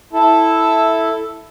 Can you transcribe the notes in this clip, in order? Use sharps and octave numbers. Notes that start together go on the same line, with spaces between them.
E4 A4